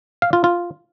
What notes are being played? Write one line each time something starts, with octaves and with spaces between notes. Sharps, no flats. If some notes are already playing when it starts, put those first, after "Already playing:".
F5
F4
F4